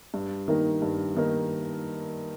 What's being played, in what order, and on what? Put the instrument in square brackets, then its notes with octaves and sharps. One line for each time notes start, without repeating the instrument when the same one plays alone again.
[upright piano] G2
D#3 A#3 D#4 A#4
G2
D#3 A#3 D#4 A#4